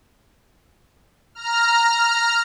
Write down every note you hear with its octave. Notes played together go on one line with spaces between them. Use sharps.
A#5 F6